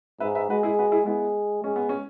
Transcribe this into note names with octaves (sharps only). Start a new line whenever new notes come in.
G#2 B4 E5
B4 E5
G#3 F#4 B4
E4 G#4
F#4 B4
E4 G#4
G#3 B3 E4
G#3 C#4
B3
C#4